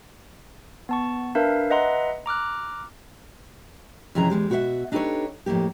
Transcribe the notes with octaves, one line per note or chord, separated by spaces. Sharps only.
B3 A5 C#6
D4 A#4 B4 E5 F5
B4 D#5 E5 F#5 A#5 C6
A#5 D6 F6 F#6
F2 C3 E3 C#4 G#4 A#5
E2 A#2 G#3 G4
B2 F#4 G4 C5 E5 F#5
D4 D#4 G4 A4 B4 C#5
F2 A2 D#3 A#3 G4